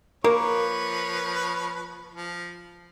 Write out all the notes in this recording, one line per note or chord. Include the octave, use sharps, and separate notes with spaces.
F3 A#3 A#4 B4 C#5
F3